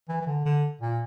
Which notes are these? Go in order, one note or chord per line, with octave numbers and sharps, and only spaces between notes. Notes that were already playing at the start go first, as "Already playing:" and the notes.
E3
E3
D3
D3
A#2